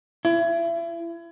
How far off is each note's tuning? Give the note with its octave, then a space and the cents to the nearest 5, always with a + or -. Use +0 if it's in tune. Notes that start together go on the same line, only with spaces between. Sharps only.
E4 +35